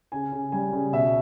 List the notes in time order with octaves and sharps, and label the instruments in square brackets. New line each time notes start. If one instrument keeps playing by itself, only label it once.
[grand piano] C#3 G#5
C#3
G3 G#5
C#3
B2 E5